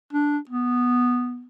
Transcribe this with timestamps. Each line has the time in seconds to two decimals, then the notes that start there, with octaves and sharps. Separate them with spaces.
0.13 D4
0.49 B3